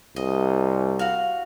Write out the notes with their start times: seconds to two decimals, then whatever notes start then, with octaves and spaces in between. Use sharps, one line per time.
0.16 C2 D#5
0.99 F#4 F5